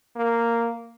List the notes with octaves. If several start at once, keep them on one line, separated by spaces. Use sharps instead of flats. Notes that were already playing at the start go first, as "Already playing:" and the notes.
A#3